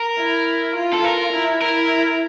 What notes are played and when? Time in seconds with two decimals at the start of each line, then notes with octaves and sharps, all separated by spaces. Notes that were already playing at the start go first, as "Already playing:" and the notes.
Already playing: A#4
0.19 E4
0.76 F4
0.93 A4
1.04 A#4
1.33 E4
1.61 E4 A#4